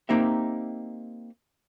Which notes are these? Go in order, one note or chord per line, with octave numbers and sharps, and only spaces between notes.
A#3 C4 D#4 G4 E5